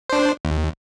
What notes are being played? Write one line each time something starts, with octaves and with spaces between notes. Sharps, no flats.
D4 C5
D#2